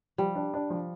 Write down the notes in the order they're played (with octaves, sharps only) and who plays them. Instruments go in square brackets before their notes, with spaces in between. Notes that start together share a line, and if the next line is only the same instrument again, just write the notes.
[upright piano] F3 [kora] G3
[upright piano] D4
D4
F3